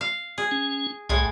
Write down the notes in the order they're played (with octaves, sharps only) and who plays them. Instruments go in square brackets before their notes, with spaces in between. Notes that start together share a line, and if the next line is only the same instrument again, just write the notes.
[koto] F5
G#4
[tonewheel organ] C#4
[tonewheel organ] C2 G#5 [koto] A2 G#3